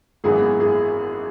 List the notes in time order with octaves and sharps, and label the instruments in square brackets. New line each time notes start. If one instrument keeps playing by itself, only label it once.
[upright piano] G#1 F#2 E3 G#3 B3 [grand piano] G#4
[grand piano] G#4